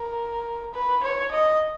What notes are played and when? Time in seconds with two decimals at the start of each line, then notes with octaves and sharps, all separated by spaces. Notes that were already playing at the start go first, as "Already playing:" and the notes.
Already playing: A#4
0.73 B4
1.03 C#5
1.31 D#5